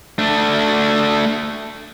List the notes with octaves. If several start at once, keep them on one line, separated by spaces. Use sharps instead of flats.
A3 D4